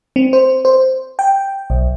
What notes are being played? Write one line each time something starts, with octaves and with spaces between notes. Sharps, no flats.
C4
C5
C5
G5
B1